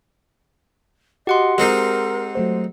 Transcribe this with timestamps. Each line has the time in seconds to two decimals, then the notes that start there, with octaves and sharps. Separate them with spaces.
1.27 F#4 G4 D#5 F#5 C6
1.58 G#3 C4 D#4 A#4
2.35 F#3 A3 C5